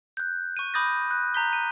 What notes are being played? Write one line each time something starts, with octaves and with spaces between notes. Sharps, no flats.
F#6 G6
C#6 D#7
B5 D6 D#6 G6 A6 A#6
F#6
A#5 G6 B6 G7
D#7